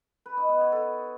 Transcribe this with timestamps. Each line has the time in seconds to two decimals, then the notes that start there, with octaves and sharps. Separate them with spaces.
0.26 B4
0.37 D#4
0.49 B3
0.61 C#5
0.72 A4